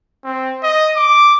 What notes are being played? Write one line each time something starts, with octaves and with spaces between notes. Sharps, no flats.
C4
D#5
D6